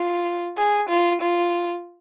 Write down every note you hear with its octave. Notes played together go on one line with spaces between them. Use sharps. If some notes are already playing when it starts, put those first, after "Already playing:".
Already playing: F4
G#4
F4
F4